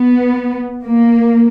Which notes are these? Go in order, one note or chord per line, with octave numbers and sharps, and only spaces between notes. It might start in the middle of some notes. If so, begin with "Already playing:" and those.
Already playing: B3
A#3